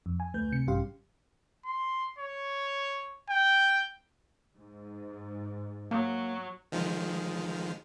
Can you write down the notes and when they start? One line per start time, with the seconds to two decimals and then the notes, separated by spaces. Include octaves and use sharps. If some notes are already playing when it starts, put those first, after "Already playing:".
0.06 F2
0.20 G#5
0.34 D2 A3 B4 G6
0.52 C3 C#7
0.67 A1 G2 C#4 G4 F5 C6
1.65 C6
2.19 C#5
3.30 G5
4.56 G#2
5.91 F#3 A#3
6.72 D#3 F3 G#3